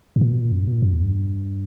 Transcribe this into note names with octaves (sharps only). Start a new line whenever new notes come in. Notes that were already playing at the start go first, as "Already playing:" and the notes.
G2
A#2
B2
A#2
F#2
G2
B2
A#2
F#2
E2
G2